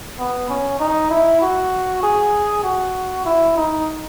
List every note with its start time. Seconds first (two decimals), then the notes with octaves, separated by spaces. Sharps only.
0.19 B3
0.49 C#4
0.80 D#4
1.10 E4
1.41 F#4
2.03 G#4
2.63 F#4
3.25 E4
3.56 D#4